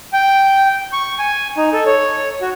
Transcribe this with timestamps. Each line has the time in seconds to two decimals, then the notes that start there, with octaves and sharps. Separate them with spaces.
0.13 G5
0.93 C#6
1.19 G#5
1.57 D#4
1.73 A4
1.86 C#5
2.41 F#4